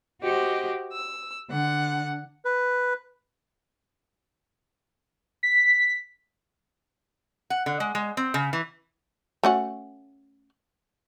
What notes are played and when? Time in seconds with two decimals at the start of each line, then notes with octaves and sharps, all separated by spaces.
0.22 F#4 G4 C5 D#5
0.93 E6
1.50 D3 F#5
2.45 B4
5.43 B6
7.50 F#5
7.66 D3
7.80 G#3
7.95 G#3
8.17 C4
8.34 C#3
8.53 E3
9.43 A3 C#4 F#4